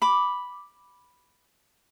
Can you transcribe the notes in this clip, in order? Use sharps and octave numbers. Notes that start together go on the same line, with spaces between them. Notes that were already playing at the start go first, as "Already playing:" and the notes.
B5 D6